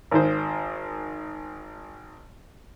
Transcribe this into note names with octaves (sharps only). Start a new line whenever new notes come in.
G#1 D#3 C5